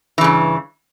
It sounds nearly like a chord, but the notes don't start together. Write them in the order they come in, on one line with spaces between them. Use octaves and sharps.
E3 C#3 G2